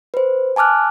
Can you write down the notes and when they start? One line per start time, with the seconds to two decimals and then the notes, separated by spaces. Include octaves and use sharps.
0.14 B4 C5
0.56 G#5 A5 D6 F6 F#6